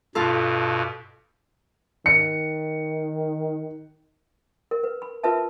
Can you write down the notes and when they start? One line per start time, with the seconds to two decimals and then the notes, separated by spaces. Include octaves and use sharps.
0.15 G2 B2 F4 A4
2.06 D#3 C#7
4.71 A#4
4.83 B4
5.02 B5
5.23 F4 A#4 B4 E5 A5